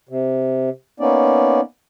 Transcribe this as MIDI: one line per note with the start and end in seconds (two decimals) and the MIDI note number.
0.09 0.69 48
1.00 1.60 58
1.00 1.60 59
1.00 1.60 61
1.00 1.60 63
1.00 1.60 74